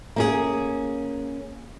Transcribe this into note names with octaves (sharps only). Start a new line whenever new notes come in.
A#3 C#4 G#4